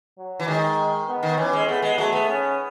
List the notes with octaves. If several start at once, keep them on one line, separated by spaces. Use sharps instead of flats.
F#3
E3
D#3 G#3
B3
D#3
E3 C#4
G#3
A3 B3
G#3
F#3 A3
B3
C#4